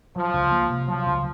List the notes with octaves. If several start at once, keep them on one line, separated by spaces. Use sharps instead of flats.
F3 F#3
C#2
A#3
C3
F3 F#3
C#2